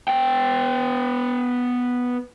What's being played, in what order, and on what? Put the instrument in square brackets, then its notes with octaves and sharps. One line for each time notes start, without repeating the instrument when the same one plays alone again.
[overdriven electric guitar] B3 G5